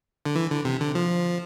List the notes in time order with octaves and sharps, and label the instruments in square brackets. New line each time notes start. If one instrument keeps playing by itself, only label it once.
[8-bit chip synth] D3
E3
D3
C3
D3
F3